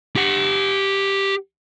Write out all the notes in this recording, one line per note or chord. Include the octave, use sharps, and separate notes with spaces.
G4 F#5